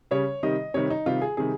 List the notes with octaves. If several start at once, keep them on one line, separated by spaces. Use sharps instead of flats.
C#3 G3 C#5
C3 D#3 G3 D#5
C3 D#3 G3 C#5
D#4
C3 D#3 G3 F4
G#4
C3 D#3 G3 G#4